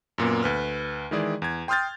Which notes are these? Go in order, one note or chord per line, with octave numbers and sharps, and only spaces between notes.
F#2 A#2 A#3 B3
D2 B4 F6
D#3 E3 G#3 E4 G#4 D5
E2 G#6
G5 C6 D#6 F6 G6 A6